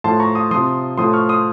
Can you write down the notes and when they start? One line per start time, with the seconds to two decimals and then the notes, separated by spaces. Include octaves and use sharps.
0.04 A2 F3 A5 C6
0.20 A#5 C#6
0.35 C6 D#6
0.51 C3 F3 C6 D#6
0.98 A2 F3 C6 D#6
1.13 C#6 F6
1.29 C6 D#6